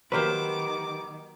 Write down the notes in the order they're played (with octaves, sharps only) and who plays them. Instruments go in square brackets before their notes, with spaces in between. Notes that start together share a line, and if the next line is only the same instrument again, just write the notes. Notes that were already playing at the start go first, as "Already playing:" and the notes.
[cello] D#3 [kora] F#3 A#3 C5 [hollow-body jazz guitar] G4 B4 [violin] D6